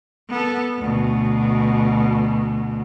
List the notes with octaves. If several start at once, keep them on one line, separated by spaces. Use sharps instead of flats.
B3 A4
D2 B2